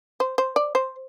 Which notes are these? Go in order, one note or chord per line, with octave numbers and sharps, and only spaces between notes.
C5
C5
D5
C5